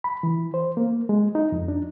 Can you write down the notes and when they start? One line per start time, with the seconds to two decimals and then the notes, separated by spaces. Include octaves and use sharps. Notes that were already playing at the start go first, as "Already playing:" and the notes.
0.04 B5
0.23 E3
0.54 C5
0.77 A#3
1.09 G#3
1.35 D#4
1.52 F2
1.68 D4